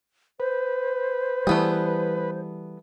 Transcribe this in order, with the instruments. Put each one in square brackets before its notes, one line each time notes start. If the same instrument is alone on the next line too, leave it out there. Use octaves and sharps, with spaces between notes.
[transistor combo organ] B4 [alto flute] C5
[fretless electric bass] E3 G3 [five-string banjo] A3 B3 G#4